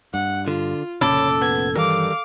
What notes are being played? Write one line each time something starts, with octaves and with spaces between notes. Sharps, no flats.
G2 F#5
D3 F4
F1 A#2 C#3 C#4 A4 C#5 B5 D6
B3 G#6
G2 D#3 E3 G3 A#4 F5 D6